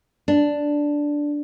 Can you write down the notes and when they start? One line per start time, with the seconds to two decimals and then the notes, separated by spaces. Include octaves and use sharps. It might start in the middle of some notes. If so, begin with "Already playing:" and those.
0.28 D4